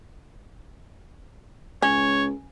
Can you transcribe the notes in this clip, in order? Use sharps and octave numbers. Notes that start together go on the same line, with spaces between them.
C#2 C#4 C#5